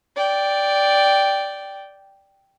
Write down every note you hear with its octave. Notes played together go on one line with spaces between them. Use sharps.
D5 G5